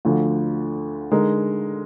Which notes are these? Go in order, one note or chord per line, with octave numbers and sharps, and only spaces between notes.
D2 D3 F3
D3 G#3 D#4 A#4